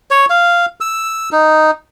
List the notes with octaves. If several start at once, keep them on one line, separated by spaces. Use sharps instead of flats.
C#5
F5
E6
D#4